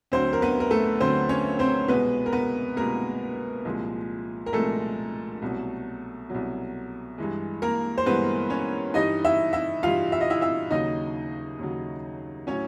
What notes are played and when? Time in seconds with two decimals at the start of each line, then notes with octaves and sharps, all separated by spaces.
0.12 D2 D3 F#3 C4 C5
0.33 A#4
0.42 B3 B4
0.60 A#4
0.71 A3 A4
1.00 D2 D3 F#3 C4 C5
1.29 C#4 C#5
1.59 C4 C5
1.88 C2 B2 G#3 B3 B4
2.26 A#4
2.33 B3 B4
2.77 C2 B2 G#3 A#3 A#4
3.65 C2 A#2 F3 G#3
4.46 A#4
4.53 C2 A#2 F3 G#3 A3 A4
5.42 C2 B2 F#3
6.30 C2 B2 F#3
7.18 G2 E3 G#3
7.62 A#3 A#4
7.98 C5
8.06 G2 E3 G#3 B3 B4
8.50 C#4 C#5
8.94 G2 E3 G3 D#4 D#5
9.25 E4 E5
9.53 E4 E5
9.83 G2 E3 G3 F4 F5
10.12 E5
10.21 D#5
10.30 E4 E5
10.41 E4 E5
10.70 D#2 C#3 F#3 D#4 D#5
11.59 D#2 C#3 F#3
12.47 A2 F#3 C#4 C#5